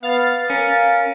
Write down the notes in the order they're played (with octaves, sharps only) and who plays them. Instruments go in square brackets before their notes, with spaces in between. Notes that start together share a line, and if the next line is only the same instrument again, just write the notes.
[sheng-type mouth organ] B3 [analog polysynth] F5 A6
[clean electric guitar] C#4 [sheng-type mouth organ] A#4